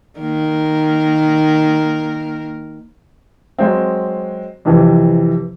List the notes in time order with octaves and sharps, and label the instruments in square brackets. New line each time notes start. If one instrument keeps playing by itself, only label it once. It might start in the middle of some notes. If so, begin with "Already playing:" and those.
[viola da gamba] D#3 A#3 A#4
[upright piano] F#3 G#3 C4
F2 C3 E3